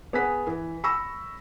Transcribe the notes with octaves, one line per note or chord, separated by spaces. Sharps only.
B3 G#4 B4 B6
E3
B5 C#6 E6 A#6